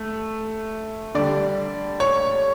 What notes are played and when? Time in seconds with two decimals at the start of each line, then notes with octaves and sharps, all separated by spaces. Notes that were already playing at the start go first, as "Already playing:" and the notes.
Already playing: A3
1.15 D3 G3 D5
2.00 C#5